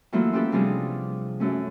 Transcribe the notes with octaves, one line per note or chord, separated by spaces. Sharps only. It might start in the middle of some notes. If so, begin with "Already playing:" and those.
E3 F#3 A3 A#3 E4 F4
C#4 F4 G4 A4 B4
C3 F3 G3 D4 G#4
F#2 A3 C#4